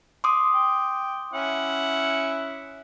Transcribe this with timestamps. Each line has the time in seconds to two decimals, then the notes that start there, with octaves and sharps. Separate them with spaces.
0.24 C6 D6 D#6
0.53 G5
1.33 C#4 E4 F#5